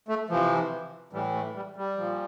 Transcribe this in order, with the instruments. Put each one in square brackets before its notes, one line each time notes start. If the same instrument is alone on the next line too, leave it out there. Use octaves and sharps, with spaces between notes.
[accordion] A3
C3 E3 F3
A2 E3 G3
A3
G3
G3
A#2 F3